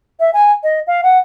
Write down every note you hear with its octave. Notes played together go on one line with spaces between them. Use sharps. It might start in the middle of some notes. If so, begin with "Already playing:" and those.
E5
G#5
D#5
F5
F#5